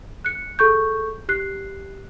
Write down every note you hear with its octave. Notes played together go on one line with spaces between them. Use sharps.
F#6 C#7
G#4 A4 C#6 G6
G4 F#6 C7